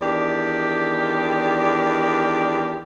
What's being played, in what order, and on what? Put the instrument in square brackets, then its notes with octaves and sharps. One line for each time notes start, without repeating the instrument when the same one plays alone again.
[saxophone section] E2 D#3 D4 G4 D5